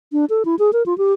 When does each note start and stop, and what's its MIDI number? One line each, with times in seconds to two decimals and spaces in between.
0.12 0.25 62
0.30 0.43 69
0.45 0.56 64
0.59 0.71 68
0.73 0.83 70
0.86 0.97 65
0.98 1.13 67